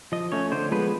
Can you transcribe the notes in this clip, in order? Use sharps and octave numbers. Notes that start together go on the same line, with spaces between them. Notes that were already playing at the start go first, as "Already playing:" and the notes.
F3 D#5
A3 C#4 C#5
D3 C5
F3 G#3 B3 B4